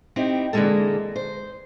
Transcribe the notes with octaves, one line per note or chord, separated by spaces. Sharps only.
C4 D#4 E4 G4
D3 E3 F#3 G#3 A#3 A4
C5